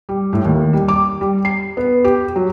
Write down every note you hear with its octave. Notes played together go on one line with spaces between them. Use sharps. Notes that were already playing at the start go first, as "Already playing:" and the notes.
G3
A2
D#2
G3
D6
G3
C7
B3
G4
F#3